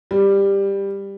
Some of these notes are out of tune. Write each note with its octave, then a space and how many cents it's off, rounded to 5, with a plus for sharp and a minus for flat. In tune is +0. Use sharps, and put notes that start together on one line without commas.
G3 +10